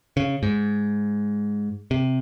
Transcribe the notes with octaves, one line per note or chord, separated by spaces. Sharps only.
C#3
G#2
C3